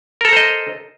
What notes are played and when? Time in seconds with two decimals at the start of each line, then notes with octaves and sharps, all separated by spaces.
0.21 A#4
0.25 A4
0.29 A#5
0.33 C5
0.37 D#5